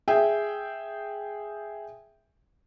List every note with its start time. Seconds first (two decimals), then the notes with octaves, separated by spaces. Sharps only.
0.08 G#4 E5 G5